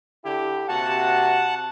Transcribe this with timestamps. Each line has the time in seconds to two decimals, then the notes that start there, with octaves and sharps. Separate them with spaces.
0.24 D3 E4 G4
0.69 C3 A#3 F#4 F#5 A5